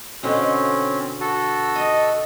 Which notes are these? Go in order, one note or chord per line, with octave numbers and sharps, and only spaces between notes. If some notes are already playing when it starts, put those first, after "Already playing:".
B2 D3 C4 C#4
F#4 A4
D#5